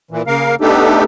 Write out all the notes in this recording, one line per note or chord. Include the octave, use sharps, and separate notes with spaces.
A#2 E3
C#3 A#3 A#4 F5
A3 B3 D4 D#4 G4 A4